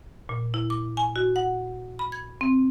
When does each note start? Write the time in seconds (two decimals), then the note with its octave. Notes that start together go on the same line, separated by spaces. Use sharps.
0.29 A#2
0.54 E4
0.70 D6
0.97 G#5
1.16 F#4
1.36 F#5
1.99 B5
2.12 G#6
2.41 C4